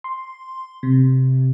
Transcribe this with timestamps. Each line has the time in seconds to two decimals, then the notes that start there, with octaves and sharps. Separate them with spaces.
0.04 C6
0.83 C3